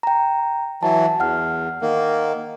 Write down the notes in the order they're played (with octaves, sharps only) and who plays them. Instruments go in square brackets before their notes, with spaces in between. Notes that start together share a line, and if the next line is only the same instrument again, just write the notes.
[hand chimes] G5 A#5
[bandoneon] E3 F#3 [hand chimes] A5
[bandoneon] E2 [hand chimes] F#5 F6
[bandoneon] D#3 A#3